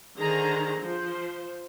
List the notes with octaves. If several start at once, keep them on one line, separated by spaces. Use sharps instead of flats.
D3 D#3 G#4 C5 A#5
F3 C5